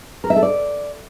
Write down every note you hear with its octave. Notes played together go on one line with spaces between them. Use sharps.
A#4
E5
A4
D5